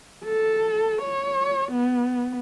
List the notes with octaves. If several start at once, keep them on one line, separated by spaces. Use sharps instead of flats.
A4
C#5
B3